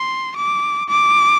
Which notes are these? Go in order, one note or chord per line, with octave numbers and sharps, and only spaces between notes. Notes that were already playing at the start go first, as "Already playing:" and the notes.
Already playing: C6
D6
D6